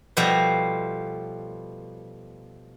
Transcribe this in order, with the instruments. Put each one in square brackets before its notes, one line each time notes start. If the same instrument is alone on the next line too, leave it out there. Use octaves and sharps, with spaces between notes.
[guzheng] B2 F3 G3 A3 C5 A#5